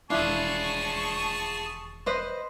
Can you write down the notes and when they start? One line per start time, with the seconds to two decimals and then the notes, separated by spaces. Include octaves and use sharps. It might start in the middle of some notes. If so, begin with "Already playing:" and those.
0.10 E1 D#2 D4 E4 F4 G#4 A5 C#6
2.06 B4 C5 D#5